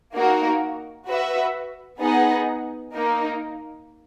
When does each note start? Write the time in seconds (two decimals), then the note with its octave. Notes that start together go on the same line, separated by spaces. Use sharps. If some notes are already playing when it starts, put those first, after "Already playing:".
0.13 A#3 D#4 F#4 A#4
1.07 F#4 B4 E5
2.00 B3 D#4 G#4 D#5 F#5
2.94 A#3 D#4 A#4